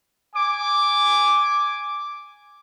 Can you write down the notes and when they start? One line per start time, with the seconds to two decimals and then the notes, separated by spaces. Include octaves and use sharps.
0.35 G#5 D6